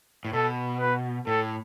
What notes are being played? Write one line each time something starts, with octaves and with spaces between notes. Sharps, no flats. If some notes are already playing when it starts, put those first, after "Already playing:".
A2
B2 A4
B4
A2 A4